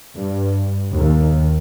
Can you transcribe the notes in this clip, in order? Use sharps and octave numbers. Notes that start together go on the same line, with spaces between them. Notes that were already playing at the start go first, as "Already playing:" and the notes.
G2
D#2